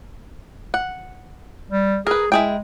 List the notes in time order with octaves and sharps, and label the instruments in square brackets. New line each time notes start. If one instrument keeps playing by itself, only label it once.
[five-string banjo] F#5
[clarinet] G3
[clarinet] G#4 [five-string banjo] A#4 B4
[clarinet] G#3 [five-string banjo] E4 G#4 G5